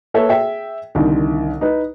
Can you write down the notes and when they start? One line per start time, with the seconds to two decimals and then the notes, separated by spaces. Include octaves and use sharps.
0.14 A#3 A4 B4 C#5 E5
0.29 G#4 E5 G5
0.95 C2 D3 D#3
1.61 D#4 B4